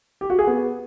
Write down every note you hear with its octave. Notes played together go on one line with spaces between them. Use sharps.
G4
F#4
G#4
B3